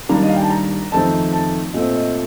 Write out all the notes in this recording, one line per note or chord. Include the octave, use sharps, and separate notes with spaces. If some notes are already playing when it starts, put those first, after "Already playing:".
D#3 G3 A#3 D4 A#5
D#5
F5
G5
A5
A#5
F2 D#3 A3 C4 D#4 A5
A5
A#2 A3 C4 D#5
D#5